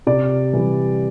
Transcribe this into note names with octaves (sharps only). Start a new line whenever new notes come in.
C3 D5
E3 G3